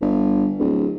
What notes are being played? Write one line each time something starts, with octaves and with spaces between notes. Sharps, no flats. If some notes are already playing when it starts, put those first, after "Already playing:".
G1
D1